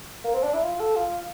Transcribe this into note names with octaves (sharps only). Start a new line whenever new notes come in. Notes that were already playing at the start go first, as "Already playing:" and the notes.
A#3
C4
D4
E4
F4
A4
F4